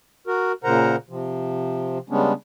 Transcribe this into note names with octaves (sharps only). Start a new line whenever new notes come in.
F#4 A#4
A#2 C#3 A#4 C5 F#5 A#5
C3 F3
C#3 G3 G#3 B3 C#4 D4